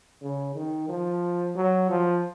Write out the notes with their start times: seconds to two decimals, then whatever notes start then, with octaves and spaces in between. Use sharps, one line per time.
0.22 C#3
0.56 D#3
0.89 F3
1.56 F#3
1.90 F3